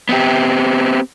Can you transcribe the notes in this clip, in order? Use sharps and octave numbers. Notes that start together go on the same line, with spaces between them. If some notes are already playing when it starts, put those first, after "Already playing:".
B3 C4 G4